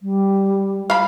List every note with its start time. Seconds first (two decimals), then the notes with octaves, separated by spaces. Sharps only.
0.01 G3
0.90 F5 B5